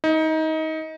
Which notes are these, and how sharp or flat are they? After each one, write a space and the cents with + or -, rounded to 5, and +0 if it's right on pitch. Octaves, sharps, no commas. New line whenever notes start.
D#4 +25